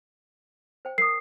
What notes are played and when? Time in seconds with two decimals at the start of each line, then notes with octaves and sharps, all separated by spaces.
0.85 C5 G5
0.98 A#4 D#6 C7